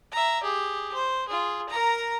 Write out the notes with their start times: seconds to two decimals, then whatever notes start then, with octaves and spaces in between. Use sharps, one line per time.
0.12 E5 A#5
0.43 G4 G#4
0.94 C5
1.28 F4 G#4
1.69 A#4 A#5